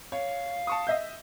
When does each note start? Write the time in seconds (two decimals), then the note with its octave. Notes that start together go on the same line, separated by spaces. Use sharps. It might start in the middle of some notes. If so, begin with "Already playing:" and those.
0.12 C#5 F5
0.67 A5 C#6 D#6
0.87 D#5 E5 G6